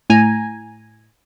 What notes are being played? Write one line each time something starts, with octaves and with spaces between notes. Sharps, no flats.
A2 G#5 A#5